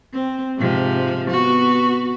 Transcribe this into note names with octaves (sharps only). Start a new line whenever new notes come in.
C4
G#2 C3 F3
B3 F#4